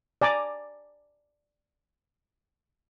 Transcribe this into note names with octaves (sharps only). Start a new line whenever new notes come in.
D5 G#5 A#5 D6